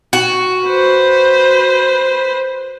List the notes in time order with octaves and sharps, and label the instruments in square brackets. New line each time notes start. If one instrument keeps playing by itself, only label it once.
[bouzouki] F#4
[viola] B4 C5